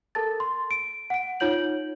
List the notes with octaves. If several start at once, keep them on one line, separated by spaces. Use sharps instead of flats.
A4 A#4 A5 A6
C6
D7
F#5 D7
D#4 F4 C#5 G6 F#7